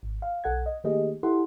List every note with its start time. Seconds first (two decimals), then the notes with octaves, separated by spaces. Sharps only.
0.03 G#1
0.22 F5
0.44 B1 A4 F#5 G#6
0.66 D#5
0.84 D#3 A3 A#3 G4 G#4 D#5
1.23 E4 G4 A4 F#5 C6